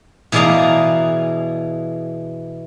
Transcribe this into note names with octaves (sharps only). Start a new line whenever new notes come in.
B2 E3 G#4 D5 F5 A#5